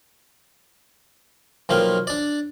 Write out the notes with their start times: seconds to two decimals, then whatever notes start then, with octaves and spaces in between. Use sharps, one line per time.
1.69 B1 F3 A#3 F5 G5
2.07 D4 D5